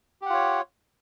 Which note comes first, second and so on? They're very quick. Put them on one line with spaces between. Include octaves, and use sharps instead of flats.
G4 F#5 F4 C#5